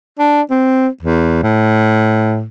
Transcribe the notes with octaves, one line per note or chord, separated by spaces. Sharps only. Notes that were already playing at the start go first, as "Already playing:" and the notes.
D4
C4
E2
A2